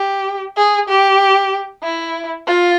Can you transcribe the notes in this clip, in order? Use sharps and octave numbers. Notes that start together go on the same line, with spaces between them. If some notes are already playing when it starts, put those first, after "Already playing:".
Already playing: G4
G#4
G4
E4
F4